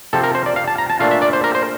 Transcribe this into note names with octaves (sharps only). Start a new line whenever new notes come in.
C3 F3 C4 A4
A#4
C5
D5
F5
A5
A#5
A5
A#2 A3 D4 F4 F5
E5
D5
C5
A#4
C5